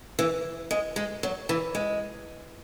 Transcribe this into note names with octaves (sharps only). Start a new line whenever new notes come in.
E3
G#3
G#3
F#3
E3
G#3